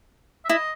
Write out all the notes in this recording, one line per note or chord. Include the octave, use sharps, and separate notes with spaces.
E5
E4 D#5